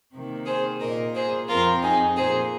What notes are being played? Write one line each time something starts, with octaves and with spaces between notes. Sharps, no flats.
C3 D#3 A#3
G#4 C5
A#2 A#3 A#4 D#5
G#4 C5
F2 F3 C4 F4 A#4
D#4 G#4
A#2 A#3 G#4 C5